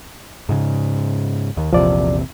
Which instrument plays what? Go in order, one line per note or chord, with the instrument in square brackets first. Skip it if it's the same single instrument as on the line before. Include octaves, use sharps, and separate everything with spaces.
[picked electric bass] G#2 C#3
D#2
[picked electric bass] A#1 E2 C3 [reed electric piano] F3 D5